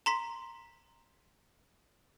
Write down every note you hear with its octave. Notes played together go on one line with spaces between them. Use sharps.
A#5 C6 B6